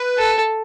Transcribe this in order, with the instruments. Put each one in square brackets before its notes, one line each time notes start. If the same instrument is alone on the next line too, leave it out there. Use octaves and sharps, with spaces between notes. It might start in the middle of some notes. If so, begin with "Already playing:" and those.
Already playing: [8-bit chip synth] B4
[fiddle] A4